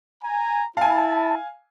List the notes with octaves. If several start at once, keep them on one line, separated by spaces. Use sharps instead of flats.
G#5 A#5
E4 F5 G#5 A5